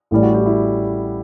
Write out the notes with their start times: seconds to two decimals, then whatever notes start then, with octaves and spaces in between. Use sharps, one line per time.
0.11 A1 A2 E3 G3 E4
0.23 F#4
0.34 E4 G4
0.46 E4